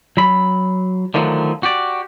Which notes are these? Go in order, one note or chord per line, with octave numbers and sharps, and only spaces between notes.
F#3 B5
D3 D#3 F3 F#3 A3 D#4
F#4 G4 D5